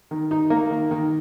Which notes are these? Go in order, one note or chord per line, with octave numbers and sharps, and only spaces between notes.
D#3
D#4
A#3
D#3
D#3